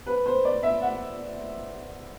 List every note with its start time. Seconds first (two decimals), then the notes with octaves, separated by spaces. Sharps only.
0.07 B4
0.26 C5
0.45 D5
0.63 E5
0.82 F#5